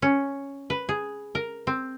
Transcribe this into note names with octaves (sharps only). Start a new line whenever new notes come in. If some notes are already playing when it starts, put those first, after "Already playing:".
C#4
B4
G#4
A#4
C4